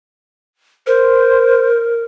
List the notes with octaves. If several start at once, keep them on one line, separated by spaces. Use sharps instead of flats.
A#4 C5